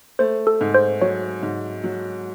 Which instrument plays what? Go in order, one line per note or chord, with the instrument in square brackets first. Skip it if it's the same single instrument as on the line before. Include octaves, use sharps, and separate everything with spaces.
[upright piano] A3 [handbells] C5
[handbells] A4
[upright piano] G#2
[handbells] C5
[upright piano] F#3 [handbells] C#5
[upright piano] G#2
F#3